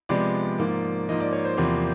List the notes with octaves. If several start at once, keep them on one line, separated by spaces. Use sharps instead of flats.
C3 F3 G#3 B3 D5
G#2 F3 A#3
G#2 F3 A#3 D#5
D5
C#5
C5
E2 C3 F3 A#3